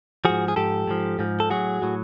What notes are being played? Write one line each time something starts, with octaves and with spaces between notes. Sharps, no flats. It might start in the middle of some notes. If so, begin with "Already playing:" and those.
G#2 F3 F#4 G#4
G#4
G#2 F3 G4 A4
G#2 F3
G#2 F3
A4
A2 F#3 F#4 G#4
A2 F#3